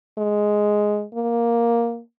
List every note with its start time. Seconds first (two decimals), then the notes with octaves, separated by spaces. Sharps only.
0.18 G#3
1.14 A#3